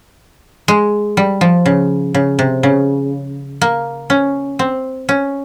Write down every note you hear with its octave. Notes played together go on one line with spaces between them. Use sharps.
G#3
G3
F3
C#3
C#3
C3
C#3
A#3
C#4
C4
C#4